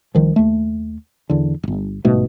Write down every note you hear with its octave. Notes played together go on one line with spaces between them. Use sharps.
C2 D#3 F3
D#2 A3
E2 D3
D1 G1
G1 G#2 B2 A3